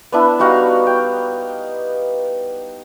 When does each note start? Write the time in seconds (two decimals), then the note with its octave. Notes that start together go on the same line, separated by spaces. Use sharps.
0.12 B3 D4 E4
0.39 G3 D#4 F#4 F5
0.87 G5